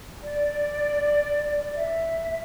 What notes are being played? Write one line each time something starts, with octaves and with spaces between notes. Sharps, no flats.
D5
E5